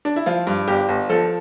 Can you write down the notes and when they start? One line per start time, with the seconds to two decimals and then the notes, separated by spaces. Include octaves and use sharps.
0.05 D4
0.16 E4
0.26 F3 F4
0.47 G2
0.68 G1 G4
0.89 G1
1.09 F3 A4